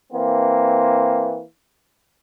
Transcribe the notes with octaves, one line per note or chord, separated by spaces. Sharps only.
E3 A#3 C4